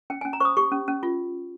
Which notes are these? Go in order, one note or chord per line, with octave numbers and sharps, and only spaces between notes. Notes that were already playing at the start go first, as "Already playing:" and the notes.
C#4 G5
C#4 G#5
A#5
C5 C#6 D#6
G4 C#6
C#4
C#4
F4